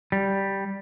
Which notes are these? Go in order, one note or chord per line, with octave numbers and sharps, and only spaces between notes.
G3